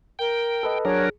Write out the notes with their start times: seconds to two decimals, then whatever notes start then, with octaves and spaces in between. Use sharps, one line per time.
0.19 A#4 G5
0.63 A4 B4 D#5
0.85 F#3 D4 G#4 A#4 C#5